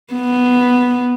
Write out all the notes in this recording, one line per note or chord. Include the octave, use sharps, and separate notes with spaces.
B3